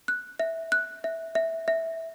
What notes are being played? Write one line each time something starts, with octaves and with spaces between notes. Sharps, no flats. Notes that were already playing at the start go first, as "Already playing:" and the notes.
F#6
E5
F#6
E5
E5
E5